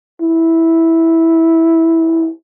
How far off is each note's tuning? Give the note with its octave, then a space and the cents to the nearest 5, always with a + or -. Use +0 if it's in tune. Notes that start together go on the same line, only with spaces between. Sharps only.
E4 -10